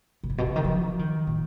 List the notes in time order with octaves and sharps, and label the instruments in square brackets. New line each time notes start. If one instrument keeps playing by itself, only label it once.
[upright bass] A#2
G#2
B2
C#3
D#3
F3
D#3
A#2